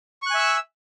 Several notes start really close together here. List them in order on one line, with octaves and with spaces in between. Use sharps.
C#6 F#6 G#5 E5 E6